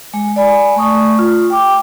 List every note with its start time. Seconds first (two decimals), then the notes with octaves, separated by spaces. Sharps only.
0.14 G#3
0.36 D5 G#5 B5
0.76 A3 C#6 D#6
1.19 F4
1.50 G5 D6